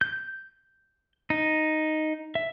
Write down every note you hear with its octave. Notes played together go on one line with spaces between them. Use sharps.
G6
D#4
E5